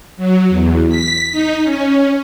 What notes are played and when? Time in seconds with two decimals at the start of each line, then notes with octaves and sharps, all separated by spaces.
0.17 F#3
0.48 E2
0.89 B6
1.31 D#4
1.63 C#4